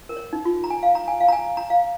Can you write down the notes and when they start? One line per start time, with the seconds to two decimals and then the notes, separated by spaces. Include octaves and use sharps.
0.09 A#4
0.17 C#5
0.33 D#4
0.45 F4
0.64 A#5
0.70 G#5
0.83 F5
0.95 A#5
1.08 G#5
1.20 F5
1.28 A#5
1.32 G#5
1.57 A#5
1.70 F5